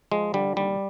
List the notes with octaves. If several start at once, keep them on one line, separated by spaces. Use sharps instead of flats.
F3 G#3
D3 G3
D#2 G3